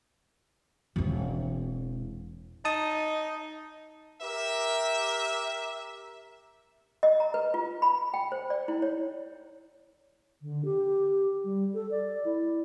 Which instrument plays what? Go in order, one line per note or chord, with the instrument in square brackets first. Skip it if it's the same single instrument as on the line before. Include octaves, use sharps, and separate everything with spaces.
[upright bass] E1 C4
[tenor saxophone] D#4 [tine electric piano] A5 D#6
[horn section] G4 A#4 E5
[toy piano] D#5
A#5
B4
F4
B5
G5
C5
D5
E4
C#5
[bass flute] D3
G4
G3
A4
D5
E4